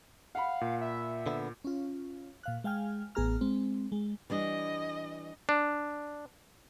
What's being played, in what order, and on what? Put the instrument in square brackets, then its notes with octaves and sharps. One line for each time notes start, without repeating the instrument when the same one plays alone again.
[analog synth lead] F5 [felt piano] F#5 B5
[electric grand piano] A#2
[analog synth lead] E5
[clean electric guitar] D3 B3
[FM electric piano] C#4 F4
A#2 F5 F#6
G#3 F5 G5 G#5 F6
A1 B3 G#4 A#5 F6
G#3 C4
G#3
[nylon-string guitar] E3 G3 D4 [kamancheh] D#5
[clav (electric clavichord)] D4